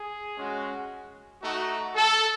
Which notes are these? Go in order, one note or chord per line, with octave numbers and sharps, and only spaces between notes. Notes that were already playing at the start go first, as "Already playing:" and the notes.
Already playing: G#4
G#3 C#4 F#4
A3 D#4 F#4
A4